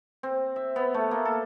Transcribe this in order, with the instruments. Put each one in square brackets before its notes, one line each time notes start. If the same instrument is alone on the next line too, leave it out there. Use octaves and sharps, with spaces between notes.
[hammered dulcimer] C4
E5
B3
A3
A#3
A4